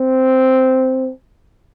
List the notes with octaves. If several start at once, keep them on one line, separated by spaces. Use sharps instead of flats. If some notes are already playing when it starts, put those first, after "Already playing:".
Already playing: C4